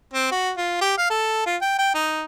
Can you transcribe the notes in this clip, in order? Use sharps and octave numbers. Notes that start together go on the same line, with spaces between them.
C4
F#4
F4
G4
F5
A4
F4
G5
G5
D#4